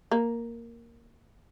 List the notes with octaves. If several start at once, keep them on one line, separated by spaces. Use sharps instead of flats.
A#3